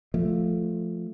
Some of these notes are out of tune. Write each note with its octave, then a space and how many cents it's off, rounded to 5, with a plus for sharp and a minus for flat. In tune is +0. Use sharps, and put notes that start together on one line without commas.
F3 +0 A3 +0